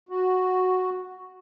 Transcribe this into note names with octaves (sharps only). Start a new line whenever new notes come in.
F#4